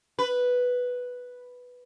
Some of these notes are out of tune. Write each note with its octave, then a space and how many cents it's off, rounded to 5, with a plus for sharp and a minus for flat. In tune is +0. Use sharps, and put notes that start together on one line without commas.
B4 +0